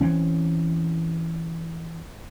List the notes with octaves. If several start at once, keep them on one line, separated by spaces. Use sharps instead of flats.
E3 C4 C#4